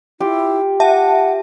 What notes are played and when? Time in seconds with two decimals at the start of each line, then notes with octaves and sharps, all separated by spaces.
0.20 E4 F4 G4
0.80 E5 F#5 A5